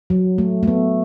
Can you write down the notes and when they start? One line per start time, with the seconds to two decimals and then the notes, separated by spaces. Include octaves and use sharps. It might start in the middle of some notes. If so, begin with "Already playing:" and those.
0.10 F#3
0.38 A3
0.63 A3
0.68 B3